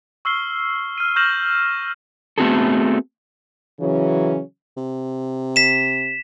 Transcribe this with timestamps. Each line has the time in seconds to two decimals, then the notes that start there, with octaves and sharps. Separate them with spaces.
0.25 C#6 E6 F6 C7 G7
0.98 F6 D#7
1.16 C#6 F6 G6 A#6 E7 F#7
2.38 A3 B3 C4 F#4 G#4 A4
3.80 C#3 E3 F#3 C#4
4.77 C3
5.56 B6 E7